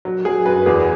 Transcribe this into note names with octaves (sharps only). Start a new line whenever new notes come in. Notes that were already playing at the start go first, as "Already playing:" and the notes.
F#3
F#3 G#4
F#2 B4
E2 G#4